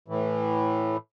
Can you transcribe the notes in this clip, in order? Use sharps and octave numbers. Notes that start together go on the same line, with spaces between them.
A2 E3